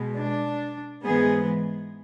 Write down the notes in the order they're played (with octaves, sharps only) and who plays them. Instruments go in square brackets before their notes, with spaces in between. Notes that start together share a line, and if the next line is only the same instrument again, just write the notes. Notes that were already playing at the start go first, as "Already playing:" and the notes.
Already playing: [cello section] B2 G#3
D4
G#2 E3 G#3 B3 G#4